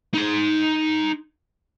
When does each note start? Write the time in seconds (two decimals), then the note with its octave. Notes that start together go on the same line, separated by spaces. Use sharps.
0.14 D#4 C6